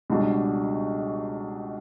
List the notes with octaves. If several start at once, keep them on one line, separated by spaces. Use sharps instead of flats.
C#2 B2 G3 D4 F#4